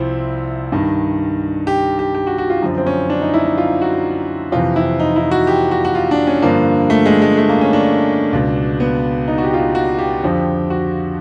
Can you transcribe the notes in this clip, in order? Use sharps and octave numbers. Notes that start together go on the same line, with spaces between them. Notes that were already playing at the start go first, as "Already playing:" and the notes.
Already playing: C2 F3 C4 E4
G2 D#3
G4
G4
G4
F#4
F#4
F4
F#2 D3 F3
C4
C#4
D4
D#4
E4
D#4
F4
F#4
F2 C3 E3 F4
E4
D#4
E4
F#4
G4
F#4
F#4
F4
D4
C#4
G2 D3 F3 A#3
A3
G#3
G#3
A3
A#3
C#4
D4
C#2 B2
B3
D#4
F#4
G4
F4
F#4
F#4
G4
F2 D3 F3
F#4